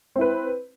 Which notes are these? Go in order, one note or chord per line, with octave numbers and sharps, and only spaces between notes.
C4 E4 B4